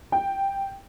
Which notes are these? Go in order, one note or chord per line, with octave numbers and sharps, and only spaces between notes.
G5